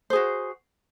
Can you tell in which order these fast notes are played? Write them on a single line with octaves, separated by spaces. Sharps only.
C5 G#4 F#4